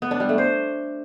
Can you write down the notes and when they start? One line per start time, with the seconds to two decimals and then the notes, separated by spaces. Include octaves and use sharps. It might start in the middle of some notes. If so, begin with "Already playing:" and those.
0.02 B3
0.11 D4
0.20 G3
0.29 A3
0.38 C5